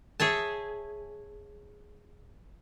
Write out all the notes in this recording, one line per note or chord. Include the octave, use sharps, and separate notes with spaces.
G#4 C#5 E5 A5